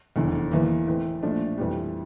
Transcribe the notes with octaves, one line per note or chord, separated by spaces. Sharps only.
F1 E2 D3
E2 E3 A#3
A2 E3 A3 C4
A#1 A#2 F3 A3 D4
F2 E3 G3